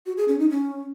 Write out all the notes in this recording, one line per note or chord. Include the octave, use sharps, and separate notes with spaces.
F#4
G#4
C#4
D#4
C#4